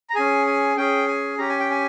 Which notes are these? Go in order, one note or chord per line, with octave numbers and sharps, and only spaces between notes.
A#5
C#4 G#4 G#5
G#5
C#4 G#4 G5
G#5
C#4 G4 A#5
G#5
G5
G#5